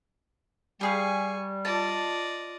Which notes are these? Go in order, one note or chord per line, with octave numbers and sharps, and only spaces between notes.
G3 G4 G#4 F5 G#5 C#6
F4 D5 D#5 A5